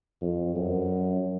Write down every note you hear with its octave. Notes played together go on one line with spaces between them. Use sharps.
F2
F#2